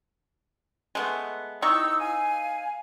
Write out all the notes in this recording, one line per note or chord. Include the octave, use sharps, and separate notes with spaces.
G#3 A3 B3
C3 D#4 E4 C#6 D#6 E6
F5 G#5